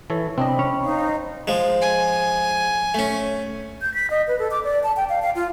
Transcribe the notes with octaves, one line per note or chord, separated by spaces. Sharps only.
E3 A4 C#5
C3 C4 D4 D#5 B5
C#4
D#4 C5 F5
F3 G#3
G#5
A3 C#4
G6
B6
D#5
B4
A4
D6
D5
A5
G5
F5
F5
F4